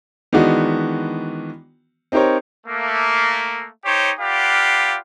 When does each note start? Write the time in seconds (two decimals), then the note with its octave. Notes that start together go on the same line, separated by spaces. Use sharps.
0.33 D#3 E3 G#3 B3 D4 F#4
2.12 C4 D#4 G4 A#4 C5 C#5
2.66 A3 A#3
3.84 D#4 G4 C5 C#5
4.19 F4 G4 B4 D5 F5 F#5